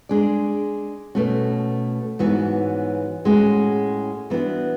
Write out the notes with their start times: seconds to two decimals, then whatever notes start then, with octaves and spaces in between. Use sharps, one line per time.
0.09 G#3 D4 G#4 D5
1.15 B2 A3 C#4 F#4
2.19 G#2 E3 B3 F#4 C#5
3.25 A2 G#3 C#4 F#4
4.30 E3 B3 D4 F#4